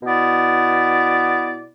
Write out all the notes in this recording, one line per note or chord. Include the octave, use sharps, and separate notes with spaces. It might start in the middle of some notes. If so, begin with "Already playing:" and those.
B2 B3 E4 D5